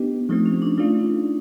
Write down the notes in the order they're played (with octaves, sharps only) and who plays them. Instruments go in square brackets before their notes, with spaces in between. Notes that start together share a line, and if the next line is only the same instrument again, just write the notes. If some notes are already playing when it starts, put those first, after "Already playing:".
Already playing: [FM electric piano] B3 D#4 G4 [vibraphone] D4
[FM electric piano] F3 A3 C4 [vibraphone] D#4
[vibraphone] C#4
D4
[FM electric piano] A3 D4 F4 [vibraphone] D#4